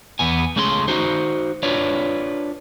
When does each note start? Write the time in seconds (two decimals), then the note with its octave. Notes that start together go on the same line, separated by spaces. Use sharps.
0.19 E2 B3 G#5
0.56 C#2 A3 C#4 G#4 E5 C6
0.88 D#4 F#4 C5
1.63 D4 F4 B4 C#5 D5